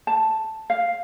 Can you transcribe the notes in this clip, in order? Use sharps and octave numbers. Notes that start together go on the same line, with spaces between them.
A5
F5